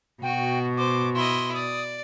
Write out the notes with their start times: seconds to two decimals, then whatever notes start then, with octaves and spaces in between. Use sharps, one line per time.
0.23 B2 F#4 G5
0.77 C5 D6
1.15 E4 D#5 C6
1.53 D5 D#6